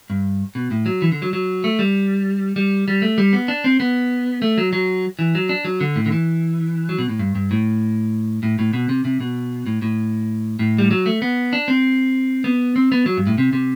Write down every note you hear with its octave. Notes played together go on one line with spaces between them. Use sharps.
G2
B2
A2
F#3
E3
D3
F#3
F#3
A3
G3
G3
G3
A3
G3
B3
D4
C4
B3
A3
F#3
F#3
E3
F#3
D4
F#3
D3
A2
D3
E3
F#3
B2
A2
G2
G2
A2
A2
A2
B2
C3
C3
B2
A2
A2
A2
G3
F#3
A3
B3
D4
C4
B3
C4
B3
F#3
G2
A2
C3
C3